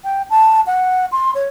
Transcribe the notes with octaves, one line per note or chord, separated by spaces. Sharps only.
G5
A5
F#5
C6
C#5